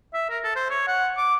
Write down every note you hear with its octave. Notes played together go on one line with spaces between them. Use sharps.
E5
A#4
A4
C5
C#5
F#5
D6